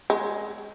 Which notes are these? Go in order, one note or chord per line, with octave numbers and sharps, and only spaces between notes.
G#3